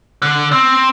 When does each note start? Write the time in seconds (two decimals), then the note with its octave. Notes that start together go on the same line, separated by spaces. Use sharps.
0.22 D3
0.52 C4